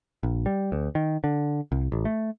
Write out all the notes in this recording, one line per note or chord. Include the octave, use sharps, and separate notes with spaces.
A#1
G3
D2
D#3
D3
C2
A1
A3